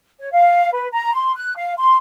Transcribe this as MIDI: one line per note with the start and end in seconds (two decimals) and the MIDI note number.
0.20 0.31 73
0.32 0.70 77
0.73 0.88 71
0.92 1.14 82
1.14 1.33 84
1.35 1.56 90
1.56 1.73 77
1.78 1.96 84